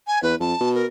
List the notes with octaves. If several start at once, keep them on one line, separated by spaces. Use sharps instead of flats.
G#5
E2 B4
F2 A5
B2
A#4